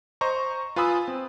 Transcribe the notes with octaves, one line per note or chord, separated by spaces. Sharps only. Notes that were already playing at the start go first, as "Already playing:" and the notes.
C5 D#5 A#5 C#6
F4 B4 G#5 B5 D#6 E6
C4